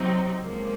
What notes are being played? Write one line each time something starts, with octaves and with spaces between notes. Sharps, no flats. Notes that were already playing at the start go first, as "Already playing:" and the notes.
Already playing: C3 F#3 C4 D#4
C#2 C3 F3 A#3